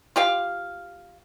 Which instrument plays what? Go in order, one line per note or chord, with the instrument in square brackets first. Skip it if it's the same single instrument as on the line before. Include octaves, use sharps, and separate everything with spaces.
[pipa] F4 G4 F5